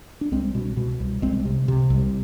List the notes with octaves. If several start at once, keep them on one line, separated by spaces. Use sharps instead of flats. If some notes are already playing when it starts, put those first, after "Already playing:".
D4
C2 G#3 C4
B2
B2
C2
C2 G#3 C4
C3
C3
C2